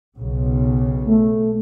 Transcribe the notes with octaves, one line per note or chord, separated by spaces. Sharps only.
B1 C#3
A3